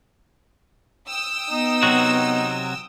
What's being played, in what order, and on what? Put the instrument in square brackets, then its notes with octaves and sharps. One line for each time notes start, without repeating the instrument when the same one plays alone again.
[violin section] G5 D#6 E6
[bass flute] B3 [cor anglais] D#4
[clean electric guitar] C3 F#3 F#4